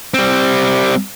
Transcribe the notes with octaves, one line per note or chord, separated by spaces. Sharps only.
G3 C4